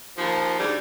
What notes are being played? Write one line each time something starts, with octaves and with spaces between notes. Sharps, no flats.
D#2 F3
D2 G#2 G3